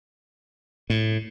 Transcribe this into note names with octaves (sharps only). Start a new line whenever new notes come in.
A2